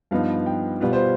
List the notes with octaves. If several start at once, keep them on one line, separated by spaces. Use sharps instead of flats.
G2 F3 B3 D#4 F5
G5
B2 G3 B3 F4 F5
C5